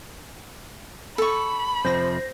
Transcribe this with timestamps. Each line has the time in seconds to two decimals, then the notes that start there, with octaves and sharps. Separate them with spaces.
1.18 A4 B5 C#6
1.85 F2 C3 F3 C5 A#6